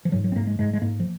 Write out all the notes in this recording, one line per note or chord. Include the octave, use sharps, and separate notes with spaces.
F3
G#2 F#3
F#3
C4
G#2 A#3
G#3
G#2 G#3
G#3
G#2 A#3
F3